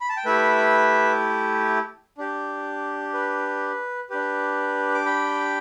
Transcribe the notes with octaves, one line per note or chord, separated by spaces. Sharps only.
B5
A5
G5
A3 E4 G4 B4 E5
D4 G4
B4
D4 G4 B4
D6
G5 B5